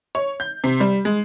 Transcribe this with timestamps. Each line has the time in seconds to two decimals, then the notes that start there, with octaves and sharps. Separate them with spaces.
0.15 C#5
0.40 G6
0.64 C3
0.80 G3
1.05 G#3